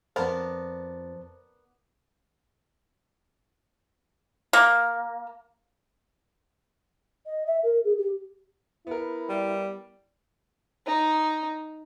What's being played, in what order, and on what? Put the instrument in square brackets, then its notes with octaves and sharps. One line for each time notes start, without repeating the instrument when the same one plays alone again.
[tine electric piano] F2 A6 [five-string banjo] B3 D4 A#4 [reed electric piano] C5 A5
[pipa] A#3
[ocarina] D#5
E5
A#4
G#4
G4
[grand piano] B3 A#4 [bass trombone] E4
[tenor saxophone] G3
[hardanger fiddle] D#4